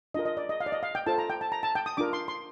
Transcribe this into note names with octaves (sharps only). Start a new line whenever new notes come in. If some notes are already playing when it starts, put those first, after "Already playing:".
D4 F4 A#4 D#5
D#5
D5
D#5
F5
D5
D#5
F5
G5
F4 A4 C5 A5
A#5
G5
A5
A#5
A5
G5
D#6
D4 F4 A#4 D6
C6
C6